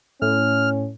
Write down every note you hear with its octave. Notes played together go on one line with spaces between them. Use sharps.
A2 C#4 F6